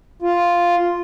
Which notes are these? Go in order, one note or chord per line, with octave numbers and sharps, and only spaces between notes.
F4